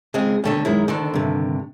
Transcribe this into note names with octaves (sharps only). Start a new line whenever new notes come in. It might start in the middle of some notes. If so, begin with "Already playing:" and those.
C#3 G#3 C4 G#4
D#2 B2 D3 G3 A3 A4
F#2 D#3 G#3 E4
D2 D3 D#3 A4
G2 C3